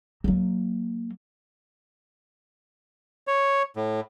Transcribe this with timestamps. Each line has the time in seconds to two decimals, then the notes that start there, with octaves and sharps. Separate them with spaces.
0.24 F#3 A#3
3.27 C#5
3.76 A2